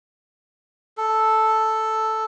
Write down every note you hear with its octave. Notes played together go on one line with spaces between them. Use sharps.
A4